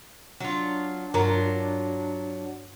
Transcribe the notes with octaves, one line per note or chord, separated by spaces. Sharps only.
F#3 D4 F4
G2 F#3 F4 A#4 A#5